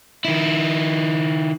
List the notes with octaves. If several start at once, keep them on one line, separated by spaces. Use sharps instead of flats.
D#3 E4